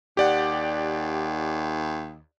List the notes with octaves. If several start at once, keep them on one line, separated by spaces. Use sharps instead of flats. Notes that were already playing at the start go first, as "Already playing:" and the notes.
D#2 G4 D5 F#5